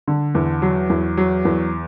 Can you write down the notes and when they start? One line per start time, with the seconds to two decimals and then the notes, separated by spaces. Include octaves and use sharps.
0.08 D3
0.35 E2
0.62 F#3
0.90 E2
1.17 F#3
1.45 E2